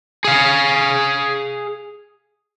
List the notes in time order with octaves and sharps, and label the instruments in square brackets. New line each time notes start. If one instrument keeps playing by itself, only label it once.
[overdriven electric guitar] G#4 F5